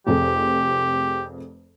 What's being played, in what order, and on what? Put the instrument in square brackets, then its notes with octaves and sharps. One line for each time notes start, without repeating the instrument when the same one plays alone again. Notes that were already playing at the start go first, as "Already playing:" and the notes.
[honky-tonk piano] F1 F2 G#4 [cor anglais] G4